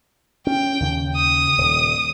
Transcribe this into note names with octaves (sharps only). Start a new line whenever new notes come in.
C#4 G5
D#2 C#3
D#6
D#1